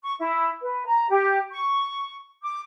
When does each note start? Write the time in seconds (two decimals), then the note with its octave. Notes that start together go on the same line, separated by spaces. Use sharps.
0.03 C#6
0.19 E4
0.61 B4
0.86 A#5
1.09 G4
1.52 C#6
2.42 D6